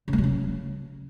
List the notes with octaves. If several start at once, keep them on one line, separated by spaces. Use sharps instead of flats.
C#3
G#3
F#3
C#3